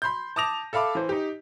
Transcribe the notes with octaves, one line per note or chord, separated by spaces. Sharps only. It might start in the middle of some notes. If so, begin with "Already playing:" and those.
B5 C6 G6
A5 D6 D#6 A#6 F7
A4 E5 F5 B5 D6
E3 C5
D#4 G4